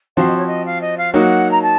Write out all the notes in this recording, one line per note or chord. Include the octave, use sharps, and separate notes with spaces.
F3 C4 F#4 F5
D#5
C#5
D#5
F5
D#5
F5
F#3 A#3 D#4 F#4 F#5
A#5
A5